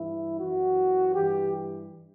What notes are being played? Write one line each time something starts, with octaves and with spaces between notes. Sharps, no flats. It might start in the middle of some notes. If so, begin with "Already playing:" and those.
Already playing: G2 E3 E4
F#2 E3 F#4
G2 E3 G4